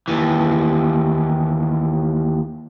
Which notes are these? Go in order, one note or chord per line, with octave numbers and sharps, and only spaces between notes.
D#2 E3